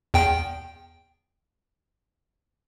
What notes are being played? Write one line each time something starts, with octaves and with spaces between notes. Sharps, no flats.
E2 G5